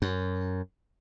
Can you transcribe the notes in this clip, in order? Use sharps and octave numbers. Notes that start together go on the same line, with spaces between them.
F#2